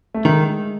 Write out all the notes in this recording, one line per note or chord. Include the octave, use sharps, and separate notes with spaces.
A3
D#3 G#3